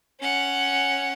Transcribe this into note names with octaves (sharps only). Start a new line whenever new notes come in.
C#4 F#5